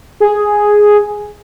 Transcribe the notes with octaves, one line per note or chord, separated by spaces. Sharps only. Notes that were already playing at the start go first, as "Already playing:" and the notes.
G#4